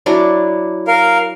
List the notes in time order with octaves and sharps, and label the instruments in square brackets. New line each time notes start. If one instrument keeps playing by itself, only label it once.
[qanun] F#3 D4 E4
[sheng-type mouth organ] A#4 F5